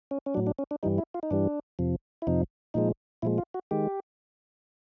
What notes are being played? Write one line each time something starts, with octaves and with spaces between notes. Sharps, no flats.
C#4
C#4
A2 F#3 D4
D4
C#4
D4
G2 E3 G3 D#4
E4
F4
D#4
G2 E3 G3 D4
F2 C3 F3
E4
F2 C3 F3 D#4
A#2 F3 G#3 D#4
A#2 F3 G#3 E4
F4
F#4
D#3 G#3 G4